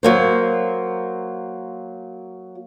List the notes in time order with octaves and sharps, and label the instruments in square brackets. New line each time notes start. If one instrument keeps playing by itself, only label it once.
[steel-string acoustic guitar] F#3 A#3 C5